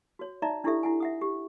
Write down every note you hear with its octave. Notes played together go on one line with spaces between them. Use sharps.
F#4 C#5
D#4 D5 E5 A#5
D4 E4 F4 G4 A4 E5
E4 F#5 G#5
E5 F#5 D#6
G4